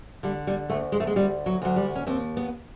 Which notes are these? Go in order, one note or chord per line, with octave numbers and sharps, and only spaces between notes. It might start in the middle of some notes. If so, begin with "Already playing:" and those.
D3 G3
G3
D2 A3
G#3
A3
G#3
D2 G3
F#3
D2 F#3
G3
C#4
D#2 C4
B3